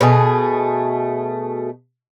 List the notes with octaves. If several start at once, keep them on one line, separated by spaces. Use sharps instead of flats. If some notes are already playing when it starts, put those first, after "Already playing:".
B2 A3 G#4